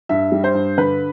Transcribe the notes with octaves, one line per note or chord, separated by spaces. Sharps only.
G2 E5
G3
C5
G2
D3 B4